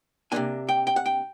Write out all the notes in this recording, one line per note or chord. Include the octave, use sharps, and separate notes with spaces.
C3 F3 A#3 D4 G#5
G5
G5
F#5
G5